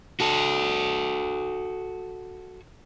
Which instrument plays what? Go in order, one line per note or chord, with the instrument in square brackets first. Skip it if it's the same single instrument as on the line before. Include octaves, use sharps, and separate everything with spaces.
[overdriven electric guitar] F#4 A4